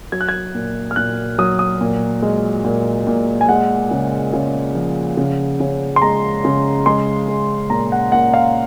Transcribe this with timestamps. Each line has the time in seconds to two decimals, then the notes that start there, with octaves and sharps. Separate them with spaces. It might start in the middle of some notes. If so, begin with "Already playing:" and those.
0.12 F#3 G#6
0.21 F#6
0.29 G#6
0.55 A#2
0.91 F6
0.96 A#2 F#6
1.38 F#3 D#6
1.59 D#6
1.81 A#2
2.22 G#3
2.64 A#2
3.07 A#2
3.41 G#5
3.49 G#3 F#5
3.91 C#3
4.33 C#3
4.75 F3
5.17 C#3
5.60 C#3
5.96 C6
6.02 G#3 A#5
6.45 C#3
6.86 G#3 C6
7.28 G#3
7.70 A#2 A#5
7.92 F#5
8.12 A#2 F#5
8.34 F5